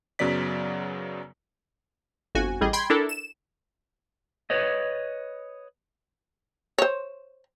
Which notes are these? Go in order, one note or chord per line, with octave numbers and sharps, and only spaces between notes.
F#2 C#3 F#3 B3 D5 B6
G1 F2 F#4 G#5
A1 G3 G#4 D#5
G5 B5 C6 G#6
D4 E4 A4 A#4
E7
B4 C#5 D#5
C5 C#5